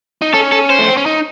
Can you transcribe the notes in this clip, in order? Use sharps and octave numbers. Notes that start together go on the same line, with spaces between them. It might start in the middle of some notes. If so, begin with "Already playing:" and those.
D#4
C#4 A4
A4
C5
A3
C4
C#4
D#4